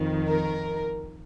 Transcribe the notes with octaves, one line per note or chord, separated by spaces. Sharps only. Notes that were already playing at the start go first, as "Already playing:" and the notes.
Already playing: F2 D#3
A#4